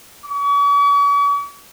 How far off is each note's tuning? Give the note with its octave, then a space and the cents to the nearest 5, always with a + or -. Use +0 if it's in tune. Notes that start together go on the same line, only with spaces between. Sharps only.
C#6 +45